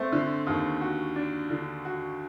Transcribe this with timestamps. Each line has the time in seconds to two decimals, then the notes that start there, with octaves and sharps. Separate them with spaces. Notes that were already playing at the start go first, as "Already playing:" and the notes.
Already playing: A3 C4
0.12 D3
0.47 D#2
0.81 F#4
1.16 D4
1.50 D3
1.85 F#4